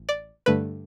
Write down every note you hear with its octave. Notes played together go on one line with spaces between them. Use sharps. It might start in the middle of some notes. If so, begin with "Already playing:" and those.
Already playing: A1
D5
G2 D3 A3 B4